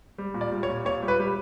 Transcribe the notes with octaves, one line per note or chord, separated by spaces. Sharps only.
G3
A#2
D5
G3
C#5
A#2
A#2 C#5
G3
B4
G3